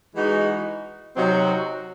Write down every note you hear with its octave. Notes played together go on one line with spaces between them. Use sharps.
E3 G#3 D#4 F#4
C3 F#3 C4 D#4 F#4